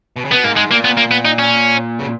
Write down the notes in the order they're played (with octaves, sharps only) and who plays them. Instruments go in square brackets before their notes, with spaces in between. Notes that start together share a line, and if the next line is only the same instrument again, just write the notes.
[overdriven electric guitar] B2
C#3
[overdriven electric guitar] B2 [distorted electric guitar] B3
[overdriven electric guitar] G#2 [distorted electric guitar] A#3
[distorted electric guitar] G#3
[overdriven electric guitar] A#2 [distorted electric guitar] A#3
[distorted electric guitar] B3
A#3
B3
D#4
C#4
[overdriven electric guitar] C#3